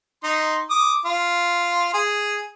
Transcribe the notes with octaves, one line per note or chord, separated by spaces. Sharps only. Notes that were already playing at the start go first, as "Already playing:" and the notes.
D#4 C6
D6 D#6
F4
G#4